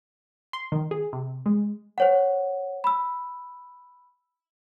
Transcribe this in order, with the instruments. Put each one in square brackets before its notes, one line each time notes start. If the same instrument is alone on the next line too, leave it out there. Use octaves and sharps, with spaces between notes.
[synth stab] C6
D#3
G#4
C3
G#3
[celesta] C5 C#5 F#5
B5 E6